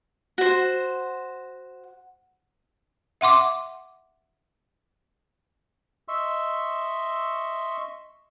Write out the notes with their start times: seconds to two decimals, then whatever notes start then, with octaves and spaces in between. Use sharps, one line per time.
0.38 F#4 C5
3.21 E5 F#5 C6 D6
6.08 D#5 E5 C6 C#6 E6